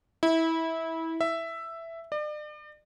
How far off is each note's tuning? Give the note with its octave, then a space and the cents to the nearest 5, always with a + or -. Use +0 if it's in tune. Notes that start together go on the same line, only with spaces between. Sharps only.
E4 -20
E5 +5
D5 +40